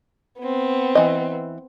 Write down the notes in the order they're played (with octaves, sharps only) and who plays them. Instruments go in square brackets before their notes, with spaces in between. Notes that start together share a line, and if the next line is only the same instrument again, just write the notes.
[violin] B3 C4
[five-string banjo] E3 D#5